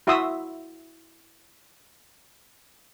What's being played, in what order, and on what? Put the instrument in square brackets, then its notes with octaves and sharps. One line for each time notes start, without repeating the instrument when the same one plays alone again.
[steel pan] E4 F#4 E5 C6 D#6 E6